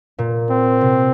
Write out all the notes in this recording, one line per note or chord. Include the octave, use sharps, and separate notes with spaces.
A#2
C4
C3